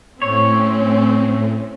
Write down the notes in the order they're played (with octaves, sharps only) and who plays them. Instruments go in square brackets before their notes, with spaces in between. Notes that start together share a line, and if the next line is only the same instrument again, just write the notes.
[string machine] A2 [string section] C4 C#4 [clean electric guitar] C#5